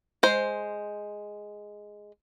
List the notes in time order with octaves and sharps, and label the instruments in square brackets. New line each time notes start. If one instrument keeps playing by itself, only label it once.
[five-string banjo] G#3 C5